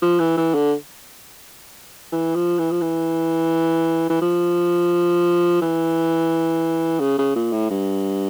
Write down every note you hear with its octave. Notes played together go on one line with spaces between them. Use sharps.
F3
E3
E3
D3
E3
F3
E3
F3
E3
E3
F3
E3
C#3
C#3
A#2
A2
G2